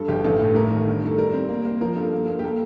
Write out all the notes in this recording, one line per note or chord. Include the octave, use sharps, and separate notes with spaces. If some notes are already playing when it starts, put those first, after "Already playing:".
Already playing: G2 A4
G1 G4
A1 A4
A2 A4
A3 A#4
D#3
G2
A3 A4
G3 A#4
C4
A#3
A#3
F3 A#4
G2 A4
A#3
A#3
G4
A#3 A4